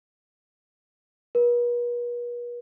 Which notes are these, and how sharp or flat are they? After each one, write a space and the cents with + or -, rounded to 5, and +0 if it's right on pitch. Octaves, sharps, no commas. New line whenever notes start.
B4 -45